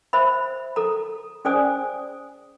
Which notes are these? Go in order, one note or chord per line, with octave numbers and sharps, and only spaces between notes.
C5 E5 B5
A4 A#5
C#4 G#4 C5 D5 G#5 D#6